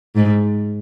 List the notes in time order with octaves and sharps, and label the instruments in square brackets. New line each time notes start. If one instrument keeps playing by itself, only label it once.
[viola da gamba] G#2